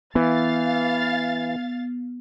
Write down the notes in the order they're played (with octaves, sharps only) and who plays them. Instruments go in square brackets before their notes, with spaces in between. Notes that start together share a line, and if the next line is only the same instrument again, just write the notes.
[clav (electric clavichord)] E3 [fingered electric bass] B3 [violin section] F5 A6